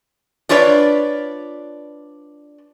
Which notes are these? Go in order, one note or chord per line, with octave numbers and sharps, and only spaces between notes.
D4 F4 B4 C#5 D5